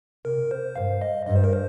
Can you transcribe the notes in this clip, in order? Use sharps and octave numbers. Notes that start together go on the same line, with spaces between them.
C3 A#4
C5
G2 F5
D#5
G2 D#5
C5
A#4
C5